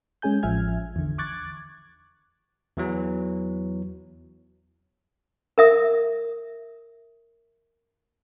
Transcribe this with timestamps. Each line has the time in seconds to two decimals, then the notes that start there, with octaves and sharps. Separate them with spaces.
0.22 G#3 C#4 G#4 G#5 G6
0.43 A1 F3 E5 G#5 F6 G#6
0.96 E2 D3
1.18 C#6 D6 F#6 G#6 A6
2.77 E2 E3 F#3
5.58 A#4 E5 D#6